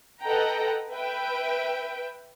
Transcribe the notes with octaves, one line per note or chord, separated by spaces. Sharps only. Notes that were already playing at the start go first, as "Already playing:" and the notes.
A4 B4 D#5 F#5 G5 A#5
B4 E5 G5 D7